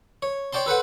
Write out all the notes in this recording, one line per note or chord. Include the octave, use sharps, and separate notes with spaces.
C#5
C#5 D5 G5 A5 C6
A4 B4 C5 F#5